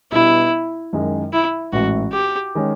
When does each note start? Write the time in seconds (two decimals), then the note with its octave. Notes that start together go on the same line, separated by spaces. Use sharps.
0.12 B2 G3 B3 D4 E4
0.93 F#2 D#3 G#3
1.33 E4
1.73 A1 G#2 E3 F#4
2.13 G4
2.55 D#3 G#3 C#4